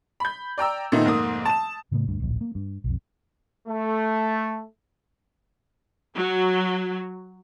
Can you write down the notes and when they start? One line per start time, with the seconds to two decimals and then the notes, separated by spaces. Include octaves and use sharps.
0.20 B5 G6
0.58 D5 G5 A#5 E6
0.92 A#2 D#3 A3 B3 D#4
1.05 F1 G#2 A#3 D#6
1.45 A5 E7
1.92 A2 C#3 A3 B3
2.08 D2 G2
2.20 D1 A#1
2.41 A#3
2.55 G2
2.84 B1 F2
3.68 A3
6.15 F#3